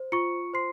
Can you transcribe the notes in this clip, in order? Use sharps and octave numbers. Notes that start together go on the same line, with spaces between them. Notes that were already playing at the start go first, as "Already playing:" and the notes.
Already playing: C5
F4 C#6 C#7
C5 C6 C7